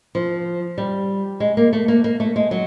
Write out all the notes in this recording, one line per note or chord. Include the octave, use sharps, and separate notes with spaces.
F3
G3
G#3
A#3
A3
A#3
A#3
A3
G#3
F#3